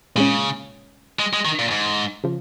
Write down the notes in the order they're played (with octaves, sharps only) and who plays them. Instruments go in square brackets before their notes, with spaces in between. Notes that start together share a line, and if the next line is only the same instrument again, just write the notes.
[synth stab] A#2 G#3 C#4 [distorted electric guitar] C#3
[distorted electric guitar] G#3
G#3
D#3
A#2
G#2
[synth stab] C#3 F3